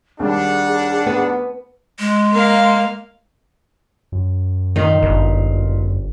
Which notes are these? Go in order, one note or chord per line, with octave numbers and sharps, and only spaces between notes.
D#2 G3 D4 G#4 F#5
B3
G#3
A#3 F5
F#2
A#2 D#3 D#4
G1